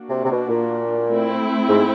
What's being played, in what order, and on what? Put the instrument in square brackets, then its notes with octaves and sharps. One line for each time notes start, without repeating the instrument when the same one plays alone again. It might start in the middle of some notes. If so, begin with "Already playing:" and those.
Already playing: [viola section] A#3 D4 F#4
[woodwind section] C3
C3
B2
A#2
[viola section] A3 C4 E4
[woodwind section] G#2